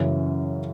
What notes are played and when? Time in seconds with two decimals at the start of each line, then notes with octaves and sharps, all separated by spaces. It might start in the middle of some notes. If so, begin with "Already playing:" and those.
Already playing: F#2 C#3 E3